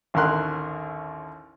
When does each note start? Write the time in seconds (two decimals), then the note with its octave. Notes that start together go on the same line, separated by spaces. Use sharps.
0.14 A1 D#2 D3 A#4 C6 F#6